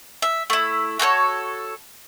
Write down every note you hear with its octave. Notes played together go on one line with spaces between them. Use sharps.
E5
A3 E4
F#4 A4 C5 C#5